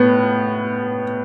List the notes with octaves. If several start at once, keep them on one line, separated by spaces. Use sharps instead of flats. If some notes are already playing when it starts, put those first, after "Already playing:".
Already playing: A2 B3